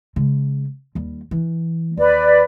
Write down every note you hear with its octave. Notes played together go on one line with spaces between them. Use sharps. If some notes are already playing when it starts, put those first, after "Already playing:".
C#3 G#3
D#2 G3
E3
D#2 B4 D5